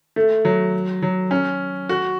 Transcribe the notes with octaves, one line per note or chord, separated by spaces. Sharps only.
A3
F#3
F#3
C#4
F#4